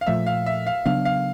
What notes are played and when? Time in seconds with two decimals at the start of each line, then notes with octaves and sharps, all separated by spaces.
0.01 F5
0.07 A#2 F3 A3 E5
0.26 F5
0.46 E5
0.66 F5
0.86 C#3 F#3 B3 D4 F5
1.05 F5